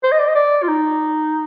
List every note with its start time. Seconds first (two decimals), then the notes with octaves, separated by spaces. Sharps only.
0.04 C5
0.12 D#5
0.19 D5
0.28 D#5
0.35 D5
0.63 F4
0.68 D#4